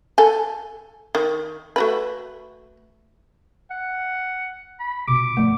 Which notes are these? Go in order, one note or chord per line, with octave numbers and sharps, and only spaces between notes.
A4 G#5
D#3
A3 F#4 B4
F#5
B5
B2 F4 D6
G1 F2 F3 A3